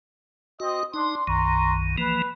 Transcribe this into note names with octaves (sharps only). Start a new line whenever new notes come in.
C4 F#4 D#5 D#6
D4 D#4 C6
B1 F#2 D#3 A#5 C6 C#6
E3 F3 A#3 B4